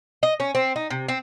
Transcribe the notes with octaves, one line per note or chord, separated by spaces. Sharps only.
D#5
C#4
C4
D#4
C3
C4